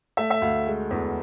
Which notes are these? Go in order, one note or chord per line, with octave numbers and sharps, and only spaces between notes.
A3 E5
E5
D2 F5
G#3
E2